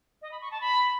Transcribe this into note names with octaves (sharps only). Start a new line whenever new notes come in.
D#5
B5
C#6
A5
B5